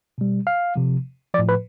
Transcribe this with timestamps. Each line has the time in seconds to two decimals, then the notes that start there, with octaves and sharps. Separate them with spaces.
0.18 B2 G3
0.47 F5
0.76 C3 F3
1.34 F3 D5
1.39 A2
1.49 B4